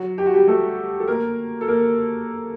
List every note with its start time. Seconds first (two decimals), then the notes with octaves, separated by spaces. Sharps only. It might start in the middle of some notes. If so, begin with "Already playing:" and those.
Already playing: F#3 F#4
0.18 G4
0.26 F#4
0.34 G3 G4
0.48 A3 A4
1.00 A4
1.07 A#3 A#4
1.61 A4
1.68 A#3 A#4